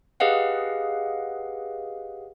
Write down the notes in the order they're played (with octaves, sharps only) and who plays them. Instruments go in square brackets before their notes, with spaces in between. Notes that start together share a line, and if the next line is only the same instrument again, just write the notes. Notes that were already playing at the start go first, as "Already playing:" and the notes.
[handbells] G4 G#4 B4 D#5 F5 F#5